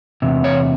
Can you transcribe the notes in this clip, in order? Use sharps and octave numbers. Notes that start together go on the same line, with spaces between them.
E2 C3
C#5